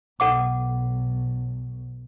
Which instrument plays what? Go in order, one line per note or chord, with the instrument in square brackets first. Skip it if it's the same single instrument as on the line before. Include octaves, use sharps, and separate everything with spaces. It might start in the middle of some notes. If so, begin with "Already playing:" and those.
[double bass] B1 [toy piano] A4 F#5 D6